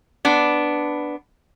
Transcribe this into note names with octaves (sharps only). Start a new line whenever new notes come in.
B3 D4